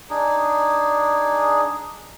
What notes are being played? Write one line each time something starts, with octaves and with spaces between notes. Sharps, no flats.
D4 D#4 G#4